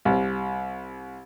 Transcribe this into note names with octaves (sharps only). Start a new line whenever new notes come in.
C2